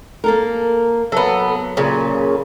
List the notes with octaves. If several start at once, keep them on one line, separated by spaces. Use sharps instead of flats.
A#3 A4 A#4
F#3 B3 A4
A#2 C#3